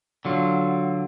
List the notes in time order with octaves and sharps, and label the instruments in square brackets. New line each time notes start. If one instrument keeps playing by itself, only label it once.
[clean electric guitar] D3 F#3 F4